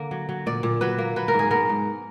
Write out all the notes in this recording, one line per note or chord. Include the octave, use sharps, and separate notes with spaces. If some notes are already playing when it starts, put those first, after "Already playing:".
Already playing: D3 A#3
F#3
F#3
A#2 D5
A#2
F#3 B4
A#3
F#3 B4
A#4
G#2
G#4
B3 A#4
G#2